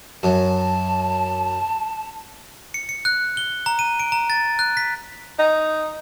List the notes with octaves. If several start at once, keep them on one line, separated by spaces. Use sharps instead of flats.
F#2 A5
C#7
C#7
F#6
G7
A#5
D#7
D7
A#5
A6
F#6
B6
D#4